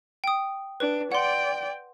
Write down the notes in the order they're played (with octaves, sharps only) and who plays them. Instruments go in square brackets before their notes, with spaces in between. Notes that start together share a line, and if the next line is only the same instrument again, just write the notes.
[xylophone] G5 D#6
[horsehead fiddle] D4 [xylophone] B4
[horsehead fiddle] D5 G5 [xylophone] F#5 C6